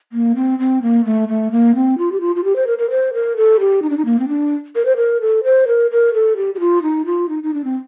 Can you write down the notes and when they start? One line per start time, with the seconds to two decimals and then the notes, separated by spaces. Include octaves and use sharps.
0.13 A#3
0.36 C4
0.59 C4
0.82 A#3
1.05 A3
1.29 A3
1.52 A#3
1.75 C4
1.98 F4
2.12 G4
2.21 F4
2.36 F4
2.44 G4
2.56 C5
2.67 A#4
2.78 A#4
2.90 C5
3.14 A#4
3.37 A4
3.60 G4
3.82 D#4
3.90 D4
3.97 D#4
4.05 A#3
4.19 C4
4.28 D4
4.75 A#4
4.85 C5
4.97 A#4
5.21 A4
5.44 C5
5.68 A#4
5.91 A#4
6.14 A4
6.37 G4
6.54 G4
6.60 F4
6.83 D#4
7.06 F4
7.29 D#4
7.43 D#4
7.54 D4
7.64 C4